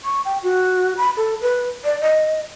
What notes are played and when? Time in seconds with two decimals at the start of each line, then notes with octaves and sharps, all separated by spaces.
0.04 C#6
0.25 G5
0.43 F#4
0.97 B5
1.17 A4
1.41 B4
1.84 D5
2.01 D#5